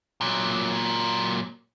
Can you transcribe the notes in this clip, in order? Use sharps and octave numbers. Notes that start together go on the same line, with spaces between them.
A#2 F#3